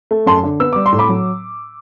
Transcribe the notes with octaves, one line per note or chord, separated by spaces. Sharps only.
A3
F#2 A5 C6
D3
B3 E6
G3 D6
C6
A2
B5 D6
F#3